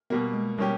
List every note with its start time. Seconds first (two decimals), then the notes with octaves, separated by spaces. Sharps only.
0.10 B2 G3 A#3 B3
0.33 G#3
0.58 B2 G3 A#3 C#4 G4